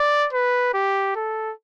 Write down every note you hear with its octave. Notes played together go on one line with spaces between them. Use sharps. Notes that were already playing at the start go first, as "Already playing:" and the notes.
Already playing: D5
B4
G4
A4